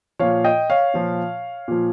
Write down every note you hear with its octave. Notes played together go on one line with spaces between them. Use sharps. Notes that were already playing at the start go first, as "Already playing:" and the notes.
A#2 F3 C#5 F5
D#5 G5
C#5 F5
A#2 F3
A#2 F3